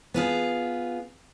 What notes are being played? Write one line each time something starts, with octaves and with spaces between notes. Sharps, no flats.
B3 F4 G#4